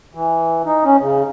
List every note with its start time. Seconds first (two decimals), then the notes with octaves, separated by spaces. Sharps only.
0.14 E3
0.66 D#4
0.85 C#4
1.00 C#3